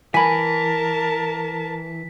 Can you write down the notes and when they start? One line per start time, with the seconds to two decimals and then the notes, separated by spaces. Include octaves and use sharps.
0.14 E3 A#4 G#5 A5 B5 B6